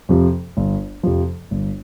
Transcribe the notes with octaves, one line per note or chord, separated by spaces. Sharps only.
F2 C3 F3
G1
F2 C3 F3
G1